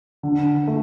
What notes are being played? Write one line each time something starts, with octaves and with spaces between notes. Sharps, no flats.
D3
A3